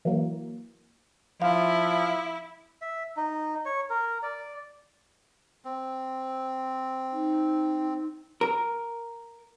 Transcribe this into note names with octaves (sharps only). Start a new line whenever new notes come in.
E3 F#3 A#3
F3 E4 F5
E5
D#4
C#5
A#4
D5
C4
D#4
A#4